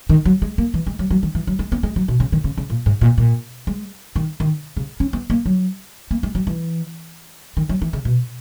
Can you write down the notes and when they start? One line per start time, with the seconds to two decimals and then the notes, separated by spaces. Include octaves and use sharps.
0.09 D#3
0.25 F#3
0.42 G#3
0.58 A#3
0.74 E3
0.87 G#3
0.99 F#3
1.10 F#3
1.23 D#3
1.35 E3
1.47 F#3
1.59 G#3
1.72 B3
1.83 G#3
1.96 F#3
2.08 B2
2.20 C#3
2.32 D#3
2.44 C#3
2.57 C#3
2.70 A#2
2.86 G#2
3.01 A#2
3.18 A#2
3.67 G#3
4.16 D#3
4.40 D#3
4.77 C#3
5.00 C#4
5.13 B3
5.30 A#3
5.46 F#3
6.11 A#3
6.23 G#3
6.35 F#3
6.47 E3
7.57 D#3
7.69 F#3
7.82 E3
7.93 C#3
8.05 B2